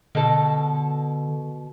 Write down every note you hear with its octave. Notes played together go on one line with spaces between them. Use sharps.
B2 D3 A4